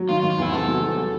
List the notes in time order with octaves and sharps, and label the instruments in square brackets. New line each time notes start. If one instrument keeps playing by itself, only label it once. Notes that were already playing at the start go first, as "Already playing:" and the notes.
Already playing: [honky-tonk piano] F#3
[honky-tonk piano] D#3 [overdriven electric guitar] F4
[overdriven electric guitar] F4
[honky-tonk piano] D#3
[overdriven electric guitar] F4
[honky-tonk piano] E2 [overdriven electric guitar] E4
[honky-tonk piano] C3 [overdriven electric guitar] A4
[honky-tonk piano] F#3
F#3
G3